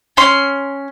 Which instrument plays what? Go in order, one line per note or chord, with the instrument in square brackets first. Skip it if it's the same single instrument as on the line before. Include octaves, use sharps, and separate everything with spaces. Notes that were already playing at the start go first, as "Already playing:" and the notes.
[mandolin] C#4 C6